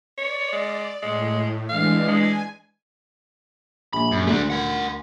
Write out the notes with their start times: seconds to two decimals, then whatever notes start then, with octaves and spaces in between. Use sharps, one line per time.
0.18 C#5 D5
0.52 G#3
1.02 A2 G#3
1.70 E3 G#3 D4 F5
2.08 G#3 G#5
3.93 A#1 B5
4.12 F#2
4.27 D2 A3 D4
4.50 A#4 F#5